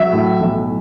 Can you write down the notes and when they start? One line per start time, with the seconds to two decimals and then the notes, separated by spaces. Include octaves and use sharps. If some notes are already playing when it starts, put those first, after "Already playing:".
Already playing: F#3 E5
0.13 A2
0.41 B1